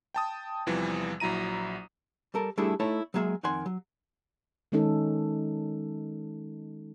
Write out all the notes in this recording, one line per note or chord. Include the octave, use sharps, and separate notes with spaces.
G5 A5 D#6
E2 C3 E3 F3 G3
A#1 F#3 E4 A#5 D#7
G3 A4 A#4
G3 A3 D4 E4 G#4 A4
A3 D#4 E4 A4 C#5
F#3 G#3 A#3 G#4 E5
F2 D#3 F#5 G#5 C6
F#3
D#3 G#3 C#4 D#4 A4